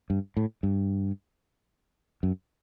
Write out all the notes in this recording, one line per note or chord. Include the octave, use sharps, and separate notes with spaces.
G2
A2
G2
F#2